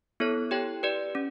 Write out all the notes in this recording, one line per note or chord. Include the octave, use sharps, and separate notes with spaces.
B3 E4 A4 C#5
E4 G4 C#5 G5
G4 B4 D5
C#4